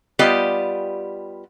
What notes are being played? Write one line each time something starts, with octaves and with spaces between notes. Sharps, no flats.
G3 B3 F4 G4 D5 D#5